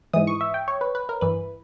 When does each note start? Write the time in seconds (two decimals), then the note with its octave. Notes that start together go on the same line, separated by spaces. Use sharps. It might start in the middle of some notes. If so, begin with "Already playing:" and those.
0.13 G#2 E3 D#6
0.27 C#6
0.41 E5
0.54 G5
0.68 C#5
0.81 B4
0.95 B4
1.09 A#4
1.21 G2 E3 B4